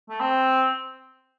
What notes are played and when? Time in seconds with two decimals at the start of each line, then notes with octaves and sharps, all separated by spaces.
0.09 A3
0.20 C4